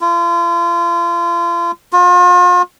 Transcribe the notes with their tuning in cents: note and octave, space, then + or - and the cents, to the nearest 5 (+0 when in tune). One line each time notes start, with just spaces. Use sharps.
F4 -35
F4 +40